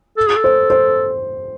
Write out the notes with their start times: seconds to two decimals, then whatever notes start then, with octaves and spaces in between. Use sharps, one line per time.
0.17 A4
0.27 G#4
0.36 A4
0.44 C5
0.70 C5